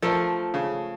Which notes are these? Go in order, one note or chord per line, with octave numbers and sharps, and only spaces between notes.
F3 A3 A4 A#4
C#3